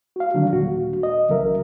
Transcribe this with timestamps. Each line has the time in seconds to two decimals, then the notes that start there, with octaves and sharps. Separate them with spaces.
0.16 F#4 F5
0.34 D3 D#3 F#3 G3 D4
0.52 D#2 A#2 F#4
1.03 D#5
1.29 C2 C#3 F#3 A#4 E5